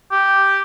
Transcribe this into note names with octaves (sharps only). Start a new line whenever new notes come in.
G4